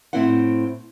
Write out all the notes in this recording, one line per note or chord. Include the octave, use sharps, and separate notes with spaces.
A2 C4 E4 C5 F#5